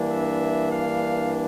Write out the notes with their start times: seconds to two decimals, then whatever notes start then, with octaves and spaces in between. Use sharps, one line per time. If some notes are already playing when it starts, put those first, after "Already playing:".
Already playing: G2 E3 A#3 D4
0.09 E5
0.72 F5